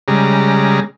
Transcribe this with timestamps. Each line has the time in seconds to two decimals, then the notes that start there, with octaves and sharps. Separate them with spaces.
0.08 C#3 G3 G#3 A#5